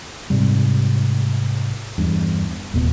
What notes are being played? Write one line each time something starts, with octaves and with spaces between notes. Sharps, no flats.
G#2 C3 G3
E2 G2
F1 D#2 A#2 B3